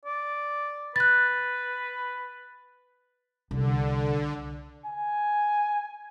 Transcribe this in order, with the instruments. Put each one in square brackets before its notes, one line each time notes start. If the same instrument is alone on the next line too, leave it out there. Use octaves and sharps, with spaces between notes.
[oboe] D5
[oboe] B4 [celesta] F#6 A6
[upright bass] C2 [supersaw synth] D3
[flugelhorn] G#5